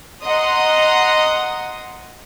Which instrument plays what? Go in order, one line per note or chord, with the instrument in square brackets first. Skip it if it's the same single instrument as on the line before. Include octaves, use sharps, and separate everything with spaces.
[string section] D#5 F#5 A#5 C6 D#6